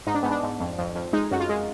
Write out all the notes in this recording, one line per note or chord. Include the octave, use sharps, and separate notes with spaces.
G#2 D#4
D4
G#2 B3
D4
G#2
F2
F2
F2
G#3 D#4
F#2 F#4
F4
G#3